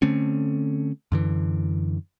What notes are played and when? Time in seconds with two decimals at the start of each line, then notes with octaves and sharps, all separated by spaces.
0.02 D3 A3 C4 C#4
1.12 F#2 D3 E3